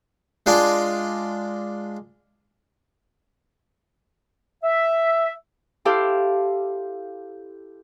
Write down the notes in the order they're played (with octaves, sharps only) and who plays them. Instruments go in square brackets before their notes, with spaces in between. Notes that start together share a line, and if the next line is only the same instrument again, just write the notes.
[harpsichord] G#3 D4 F4
[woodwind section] E5
[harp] E4 G4 A4 C5 F5